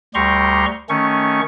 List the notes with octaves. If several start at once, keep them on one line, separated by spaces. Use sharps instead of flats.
D2 G3 G4 A#5 C6 C#6
D#3 A3 C#4 C#6